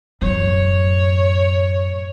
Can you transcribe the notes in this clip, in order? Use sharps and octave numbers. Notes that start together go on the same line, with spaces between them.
F#2 A2 C#5